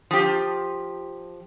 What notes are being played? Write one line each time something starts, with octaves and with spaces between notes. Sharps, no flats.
F3 G4